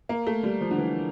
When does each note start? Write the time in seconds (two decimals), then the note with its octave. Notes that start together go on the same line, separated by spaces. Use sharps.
0.09 A#3
0.27 A3
0.43 G3
0.61 F3
0.71 D3
0.78 E3